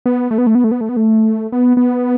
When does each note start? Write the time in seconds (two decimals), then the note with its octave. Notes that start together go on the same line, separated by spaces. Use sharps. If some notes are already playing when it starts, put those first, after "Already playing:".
0.06 B3
0.31 A3
0.38 B3
0.47 A3
0.55 B3
0.64 A3
0.71 B3
0.81 A3
0.89 B3
0.97 A3
1.52 B3
1.77 B3